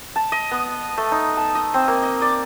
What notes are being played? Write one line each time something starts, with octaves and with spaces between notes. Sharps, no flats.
A5
D#5
B3
A3
D#4
A5
D#5
C4
A#3
D#5
D5